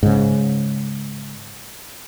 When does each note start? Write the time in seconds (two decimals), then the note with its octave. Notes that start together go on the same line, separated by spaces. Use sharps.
0.03 G#2 C#3